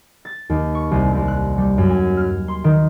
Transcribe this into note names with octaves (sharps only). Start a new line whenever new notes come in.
A6
D#2
C#6
C2
C2
F#6
G3
F#2
G#5
F6
C6
D#3